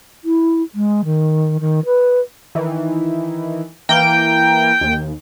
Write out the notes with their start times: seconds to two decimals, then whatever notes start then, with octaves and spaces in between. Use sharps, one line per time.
0.24 E4
0.75 G#3
1.05 D#3
1.60 D#3
1.85 B4
2.55 D#3 E3
3.89 E3 A#3 A#4 G5
4.81 D#2